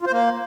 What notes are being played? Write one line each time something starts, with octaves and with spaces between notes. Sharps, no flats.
F4
C5
A#3